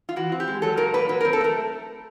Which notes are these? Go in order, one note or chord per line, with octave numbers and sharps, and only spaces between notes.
F4
E3 F#4
C4
G4
G#3
F#3 A4
A#2 A#4
A#3 B4
F#3 B4
A#4
C4
A4
A3 A#4